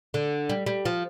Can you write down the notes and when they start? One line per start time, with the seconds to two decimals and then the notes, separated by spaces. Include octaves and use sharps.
0.14 D3
0.49 G3
0.66 G3
0.85 F3